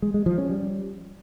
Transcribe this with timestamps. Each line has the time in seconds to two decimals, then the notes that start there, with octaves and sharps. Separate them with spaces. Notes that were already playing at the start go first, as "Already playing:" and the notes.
0.02 G#3
0.14 G#3
0.26 F3
0.38 C#4
0.50 G3